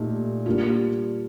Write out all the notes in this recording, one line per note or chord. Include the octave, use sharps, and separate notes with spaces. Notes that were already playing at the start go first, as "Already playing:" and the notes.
Already playing: A#2 A3 D#4 G4
G3 A#3 D4 F4